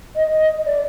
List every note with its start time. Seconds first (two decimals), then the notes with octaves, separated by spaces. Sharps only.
0.16 D#5
0.66 D5